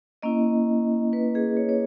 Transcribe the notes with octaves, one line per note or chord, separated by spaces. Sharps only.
A#3 C#4 E4 D#5
B4
G#4
C#5
C#5